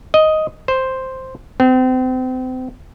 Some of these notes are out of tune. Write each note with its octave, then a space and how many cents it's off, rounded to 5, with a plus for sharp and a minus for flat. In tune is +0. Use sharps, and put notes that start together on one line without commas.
D#5 +5
C5 +0
C4 -35